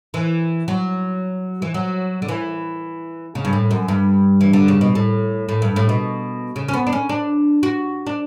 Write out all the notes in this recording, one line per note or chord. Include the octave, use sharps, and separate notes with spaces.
E3
F#3
E3
F#3
D3
E3
C#3
G2
A2
F#2
G2
E3
D3
C#3
B2
A2
A2
G2
A2
B2
C#3
C#4
B3
D4
C#4
D4
F#4
D4